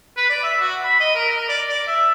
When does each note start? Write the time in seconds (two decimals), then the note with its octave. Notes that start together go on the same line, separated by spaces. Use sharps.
0.17 B4
0.29 D5
0.43 E5
0.61 F#4
0.84 B5
1.00 D#5
1.15 A#4
1.29 A#4
1.48 D5
1.69 D5
1.87 E5